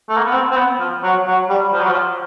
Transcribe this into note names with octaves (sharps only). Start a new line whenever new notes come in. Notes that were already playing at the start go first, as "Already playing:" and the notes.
A3
A#3
B3
C4
C4
B3
F3
F#3
F#3
G3
F3
F#3
F3